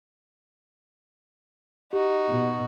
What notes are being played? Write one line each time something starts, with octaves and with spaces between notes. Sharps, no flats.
D#4 F#4 G4
B2